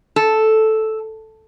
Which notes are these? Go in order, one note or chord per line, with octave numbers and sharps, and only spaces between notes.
A4